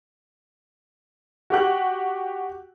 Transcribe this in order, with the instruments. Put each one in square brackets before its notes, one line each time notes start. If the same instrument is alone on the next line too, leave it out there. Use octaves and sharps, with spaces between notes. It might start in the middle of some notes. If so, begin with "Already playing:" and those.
[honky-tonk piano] F#4 G4 F#6